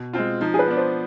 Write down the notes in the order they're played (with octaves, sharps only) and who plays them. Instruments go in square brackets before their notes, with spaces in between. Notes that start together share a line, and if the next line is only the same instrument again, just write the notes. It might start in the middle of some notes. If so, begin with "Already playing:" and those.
Already playing: [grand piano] B2
G#3 C4 F4
[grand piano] F3 [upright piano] D#4
[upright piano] G#4
B4
[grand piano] B3 D4
[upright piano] C5